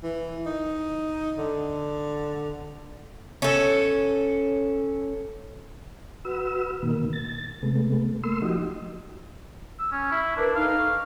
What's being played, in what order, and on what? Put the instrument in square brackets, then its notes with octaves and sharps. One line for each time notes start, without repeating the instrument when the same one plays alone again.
[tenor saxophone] E3
D#4
D3
[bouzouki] C#4 A4
[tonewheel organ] F#4 B4 E6
A#2 D#3 A#3
A6
C3 G#3 A3 B3
A3 A#3 C6 E6
F3 D#4 F#4 G4 D#5
[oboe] E6
C#4
E4
[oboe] D4 [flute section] A#4 B4
[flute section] D#4 A4 [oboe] F5
[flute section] C#6